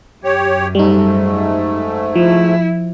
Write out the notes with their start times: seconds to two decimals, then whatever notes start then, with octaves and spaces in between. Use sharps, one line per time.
0.24 F#2 G4 C#5
0.75 G#2 G3 A3 D#4
2.16 F3 E4